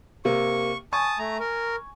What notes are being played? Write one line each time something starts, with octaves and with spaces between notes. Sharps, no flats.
C3 A#3 C#6
G#5 A5 C#6 D#6
A3 A#5
A#4